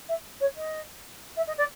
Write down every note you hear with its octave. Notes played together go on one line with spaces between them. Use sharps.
E5
C#5
D#5
E5
D#5
D5